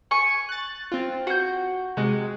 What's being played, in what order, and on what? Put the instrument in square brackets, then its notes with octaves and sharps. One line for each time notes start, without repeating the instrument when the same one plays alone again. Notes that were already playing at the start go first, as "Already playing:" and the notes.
[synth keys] G#5 [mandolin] C#6
[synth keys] F#6 A6
C4 F4
[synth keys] F#4 [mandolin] F#5 G6
[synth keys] C3 G#3 [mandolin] F#4